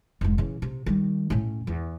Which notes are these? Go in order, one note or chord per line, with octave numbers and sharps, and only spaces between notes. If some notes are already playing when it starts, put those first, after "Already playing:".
F1 G#2
C#3 E3
C3
D#3 G3
A2 C#4
E2